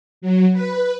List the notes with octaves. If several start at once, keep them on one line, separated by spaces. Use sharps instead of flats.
F#3
B4